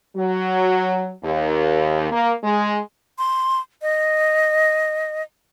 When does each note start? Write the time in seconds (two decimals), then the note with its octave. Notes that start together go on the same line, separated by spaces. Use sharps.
0.17 F#3
1.24 D#2
2.12 A#3
2.43 G#3
3.18 C6
3.82 D#5